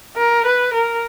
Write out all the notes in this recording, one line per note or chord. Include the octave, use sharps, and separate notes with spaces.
A#4
B4
A#4